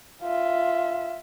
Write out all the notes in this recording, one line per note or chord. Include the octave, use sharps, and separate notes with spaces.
F4 E5